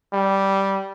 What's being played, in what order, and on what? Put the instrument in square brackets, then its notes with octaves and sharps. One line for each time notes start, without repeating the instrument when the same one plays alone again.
[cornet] G3